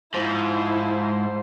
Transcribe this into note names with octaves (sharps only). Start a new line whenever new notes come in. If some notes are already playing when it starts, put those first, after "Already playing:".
G#2 F3 E4 C5